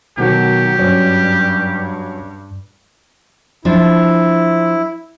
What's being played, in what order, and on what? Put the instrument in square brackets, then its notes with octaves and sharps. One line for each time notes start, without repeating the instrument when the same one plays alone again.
[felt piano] B2 D#3 [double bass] F#3 [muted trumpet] G4
[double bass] G2 [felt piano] F#3 C#4
[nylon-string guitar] F3 D4 [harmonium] E4